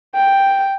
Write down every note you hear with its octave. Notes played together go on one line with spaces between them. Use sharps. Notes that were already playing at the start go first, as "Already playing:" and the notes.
G5